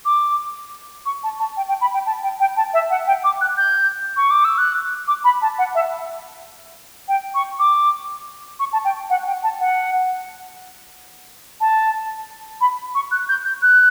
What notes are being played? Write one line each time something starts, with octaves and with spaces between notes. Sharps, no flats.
D6
C#6
A5
A5
G5
G5
B5
G5
A5
G5
G5
A5
E5
F#5
G5
D6
F#6
G6
C#6
D6
E6
F#6
D6
B5
A5
F#5
E5
G5
C#6
D6
C#6
A5
G5
F#5
G5
A5
F#5
A5
B5
C#6
F#6
G6
G6
F#6